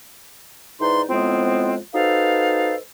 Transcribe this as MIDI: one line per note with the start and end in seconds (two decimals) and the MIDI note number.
0.80 1.02 44
0.80 1.02 52
0.80 1.02 63
0.80 1.02 71
0.80 1.02 74
0.80 1.02 84
1.08 1.75 45
1.08 1.75 53
1.08 1.75 56
1.08 1.75 59
1.08 1.75 60
1.93 2.75 63
1.93 2.75 66
1.93 2.75 69
1.93 2.75 71
1.93 2.75 72
1.93 2.75 77